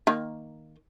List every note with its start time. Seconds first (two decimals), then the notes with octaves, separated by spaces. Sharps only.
0.07 D#3 A#3